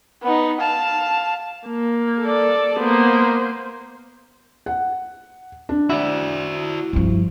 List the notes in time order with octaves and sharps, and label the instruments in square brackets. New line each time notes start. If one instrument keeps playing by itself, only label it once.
[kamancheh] B3 D#4
F5 A5
[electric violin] A#3
[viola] A4 D5
[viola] A#3 B3 [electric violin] C5
[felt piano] F#5
D4
[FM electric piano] E4 [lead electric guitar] F#4 D5
[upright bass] G2 F3